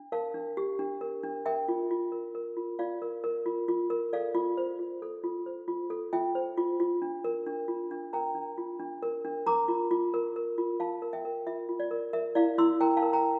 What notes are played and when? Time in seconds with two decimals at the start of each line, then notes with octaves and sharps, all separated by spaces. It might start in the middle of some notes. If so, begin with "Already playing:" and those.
Already playing: D4
0.12 A#4 F5 A5
0.34 D4
0.57 G4
0.79 D4
1.01 A#4
1.23 D4
1.46 A#4 E5 G5
1.68 F4
1.91 F4
2.12 A#4
2.35 A#4
2.57 F4
2.79 F4 D5 F5
3.02 A#4
3.24 A#4
3.46 F4
3.68 F4
3.90 A#4
4.13 A4 D5 F5
4.35 F4
4.57 C5
4.79 F4
5.02 A4
5.24 F4
5.46 C5
5.68 F4
5.90 A4
6.13 F4 E5 G5
6.35 C5
6.57 F4
6.80 F4
7.02 D4
7.24 A#4
7.46 D4
7.68 F4
7.91 D4
8.13 A#4 G5 A#5
8.35 D4
8.58 F4
8.80 D4
9.02 A#4
9.25 D4
9.46 A#4 A#5 D6
9.68 F4
9.91 F4
10.14 A#4
10.36 A#4
10.58 F4
10.80 F4 F5 A5
11.02 A#4
11.13 E5 G5
11.25 A#4
11.46 F4 E5
11.69 F4
11.80 D5
11.91 A#4
12.13 A#4 E5
12.35 E4 D5 F5
12.58 E4 C6 E6
12.81 A#4 G5 A#5
12.97 F5 A5
13.02 A#4
13.13 G5 A#5